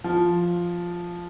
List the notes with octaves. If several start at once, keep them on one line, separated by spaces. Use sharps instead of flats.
F3